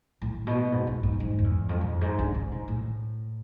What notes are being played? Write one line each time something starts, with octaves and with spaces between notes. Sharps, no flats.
A2
B2
G#2
G#2
G#2
G#2
F2
E2
F2
G#2
F2
G#2
D3
C3
G#2
A2